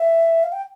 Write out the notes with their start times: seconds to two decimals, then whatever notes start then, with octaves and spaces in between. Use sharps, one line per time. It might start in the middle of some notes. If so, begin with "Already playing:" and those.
Already playing: E5
0.43 F5
0.52 G5